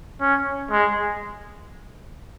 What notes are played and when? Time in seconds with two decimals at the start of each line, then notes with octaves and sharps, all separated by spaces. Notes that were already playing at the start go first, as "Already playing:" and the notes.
0.21 C#4
0.71 G#3